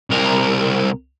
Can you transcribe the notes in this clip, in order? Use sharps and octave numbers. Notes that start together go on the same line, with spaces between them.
C2 A#4